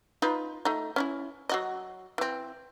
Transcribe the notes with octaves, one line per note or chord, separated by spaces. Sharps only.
D#4 F4 B4
A3 D#4
C#4 D#4 E4
F#3 F#4 D#5
E3 C4